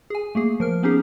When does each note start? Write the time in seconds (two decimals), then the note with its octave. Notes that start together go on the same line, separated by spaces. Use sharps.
0.10 G#4 G#5
0.35 A3 A#3 G#4
0.60 F3 A#4 F6
0.83 B3 C#4 D#4 G4 G#4